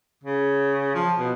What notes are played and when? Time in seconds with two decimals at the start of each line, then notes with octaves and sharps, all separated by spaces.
0.24 C#3
0.95 F3
1.18 B2